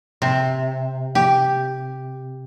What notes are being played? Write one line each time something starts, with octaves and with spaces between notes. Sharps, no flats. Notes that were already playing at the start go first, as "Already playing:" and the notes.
C3
G4